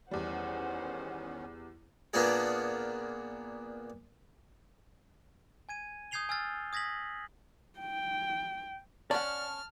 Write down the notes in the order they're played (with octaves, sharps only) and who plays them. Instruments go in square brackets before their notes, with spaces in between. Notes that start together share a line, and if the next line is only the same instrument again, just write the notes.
[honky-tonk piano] E2 G3 [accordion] D#3 B3 C#4 [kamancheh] C5 F#5
[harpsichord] A#2 A#3 B3 D4 F4 G#4
[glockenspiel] G#5 G#6 D#7
D#6 G6 G#6 C7 F7 G7
G#5 E6 F6 A6
D#6 G#6 A#6 B6 F#7
[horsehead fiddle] G5
[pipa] C#4 [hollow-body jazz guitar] D5 F#5 [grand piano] A5 [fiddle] F6